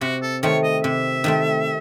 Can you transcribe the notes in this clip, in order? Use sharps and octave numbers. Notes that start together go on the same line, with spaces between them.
C3 F#4
A4
D#3 A3 C4 C#5
D#5
C3 E5
D#3 A3 C4